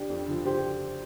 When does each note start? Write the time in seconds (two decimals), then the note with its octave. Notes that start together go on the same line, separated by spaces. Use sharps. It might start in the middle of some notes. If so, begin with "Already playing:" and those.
Already playing: D4 G4
0.10 F2
0.28 D3 F3
0.45 G4 C5